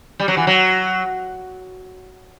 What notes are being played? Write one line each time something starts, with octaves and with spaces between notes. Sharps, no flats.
G3
F#3
E3
F#3